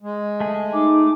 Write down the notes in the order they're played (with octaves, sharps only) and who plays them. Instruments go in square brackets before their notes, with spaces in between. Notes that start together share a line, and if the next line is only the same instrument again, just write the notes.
[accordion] G#3
[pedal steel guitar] A3 G#4
[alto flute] D#4 [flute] D6